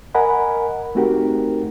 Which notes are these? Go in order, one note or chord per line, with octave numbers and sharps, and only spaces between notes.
A#4 D#5 F#5 G#5 B5
A3 C4 D#4 F#4 G4 A#4